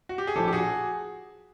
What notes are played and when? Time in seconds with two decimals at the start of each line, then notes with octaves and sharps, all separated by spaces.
0.09 F#4
0.18 G4
0.27 G#4
0.36 A#1 A2 F3 G4 A4
0.48 G4
0.52 F#4 G#4